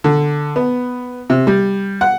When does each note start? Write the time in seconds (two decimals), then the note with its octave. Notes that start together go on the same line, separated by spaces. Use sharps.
0.04 D3
0.56 B3
1.30 C3
1.47 G3
2.01 F#5